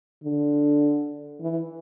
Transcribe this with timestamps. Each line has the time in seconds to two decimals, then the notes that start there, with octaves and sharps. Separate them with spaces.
0.24 D3
1.41 E3